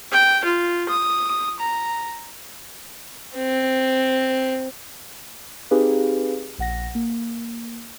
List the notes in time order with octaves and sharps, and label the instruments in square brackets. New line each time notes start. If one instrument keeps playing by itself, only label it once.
[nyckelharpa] G5
F4
D#6
A#5
[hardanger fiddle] C4
[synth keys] C4 D#4 G4 G#4 B4 F5
A#1 F#5 A#6
A#3